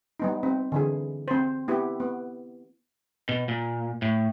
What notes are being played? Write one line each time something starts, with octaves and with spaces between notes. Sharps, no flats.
G3 B3 D#4
C4
D3 E3 G#4
C4 C5
B3 E4 G4
B3
B2
A#2
A2